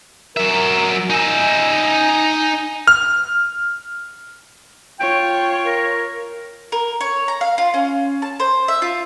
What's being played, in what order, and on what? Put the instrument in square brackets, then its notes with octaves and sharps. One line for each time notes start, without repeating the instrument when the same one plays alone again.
[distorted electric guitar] F#3 E5 [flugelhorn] A#4
[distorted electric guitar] D#4 E5 [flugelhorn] G#5
[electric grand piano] F6
[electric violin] F4 C#5 [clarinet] G5
[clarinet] A#4
[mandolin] A#4
C#5
A#5
F5
F4
C#4
A5
C5
E5
F4